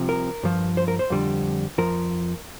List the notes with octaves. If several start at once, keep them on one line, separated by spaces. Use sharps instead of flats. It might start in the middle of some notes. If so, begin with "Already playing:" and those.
Already playing: C2 C3 F3
A#4
G2 F3
C5
A#4
C5
F2 D3 G3
F2 F3 A#4